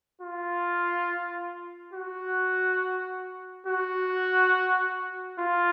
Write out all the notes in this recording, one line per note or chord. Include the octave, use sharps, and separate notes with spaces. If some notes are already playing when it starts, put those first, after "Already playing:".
F4
F#4
F#4
F4